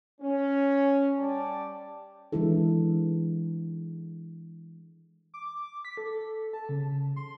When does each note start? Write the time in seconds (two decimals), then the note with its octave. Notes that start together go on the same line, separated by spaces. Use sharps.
0.21 C#4
1.19 G3 D5 G5 A5
2.32 E3 G#3 D4 E4 A4
5.34 D6
5.85 B6
5.97 A4
6.53 A5
6.69 C#3
7.16 C6